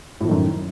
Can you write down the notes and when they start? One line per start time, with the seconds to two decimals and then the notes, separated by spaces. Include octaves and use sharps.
0.21 A2
0.24 F3
0.28 D#3
0.31 F#2